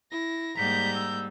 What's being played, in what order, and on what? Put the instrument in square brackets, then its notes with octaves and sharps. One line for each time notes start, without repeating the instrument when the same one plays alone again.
[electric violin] E4 A#6
[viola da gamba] G#2 G3 A#3 [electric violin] A#5 G6 [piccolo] B6
[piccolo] E6